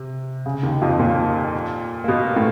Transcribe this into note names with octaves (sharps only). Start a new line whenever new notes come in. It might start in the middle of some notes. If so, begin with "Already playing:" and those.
Already playing: C3
C#3
D#2 D#3
F2 F3
A#2 A#3
A#3
B2 B3
A2 A3